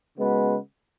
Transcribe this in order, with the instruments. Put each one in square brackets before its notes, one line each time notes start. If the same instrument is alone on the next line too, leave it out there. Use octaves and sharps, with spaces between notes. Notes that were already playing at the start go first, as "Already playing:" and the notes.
[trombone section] C#3 G#3 B3 F#4 B4